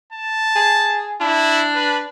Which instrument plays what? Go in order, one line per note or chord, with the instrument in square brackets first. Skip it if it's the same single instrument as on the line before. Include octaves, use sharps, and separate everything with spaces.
[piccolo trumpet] A5
[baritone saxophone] G#4
[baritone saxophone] D4 [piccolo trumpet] E4
[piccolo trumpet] B4